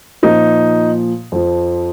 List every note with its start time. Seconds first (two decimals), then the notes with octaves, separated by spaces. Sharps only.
0.23 A#2 F3 D#4
1.32 F2 F3